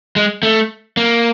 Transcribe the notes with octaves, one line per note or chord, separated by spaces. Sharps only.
G#3
A3
A#3